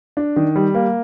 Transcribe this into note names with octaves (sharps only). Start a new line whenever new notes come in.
D4
D#3
G3
A#3